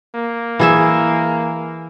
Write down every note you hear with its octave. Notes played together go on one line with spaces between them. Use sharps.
A#3
E3 G#4 E5